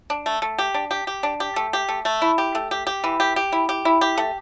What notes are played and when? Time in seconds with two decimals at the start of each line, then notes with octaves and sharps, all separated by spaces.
0.10 D4
0.26 A3
0.42 A3
0.58 G4
0.74 D4
0.91 G4
1.07 G4
1.23 D4
1.40 G4
1.56 A3
1.73 G4
1.89 A3
2.05 A3
2.22 E4
2.38 G4
2.55 A3
2.71 G4
2.87 G4
3.04 E3
3.20 G4
3.36 G4
3.52 E4
3.69 G4
3.85 E4
4.01 G4
4.17 A3